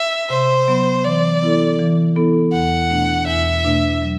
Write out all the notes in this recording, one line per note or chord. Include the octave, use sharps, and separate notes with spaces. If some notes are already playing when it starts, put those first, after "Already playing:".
Already playing: E5
C3 C5
F#3 B3
E3 D5
B3 E4 A4
E3
B3 E4 A4
E2 F#5
B2 A3 D4
E2 E5
B2 A3 D4
F#3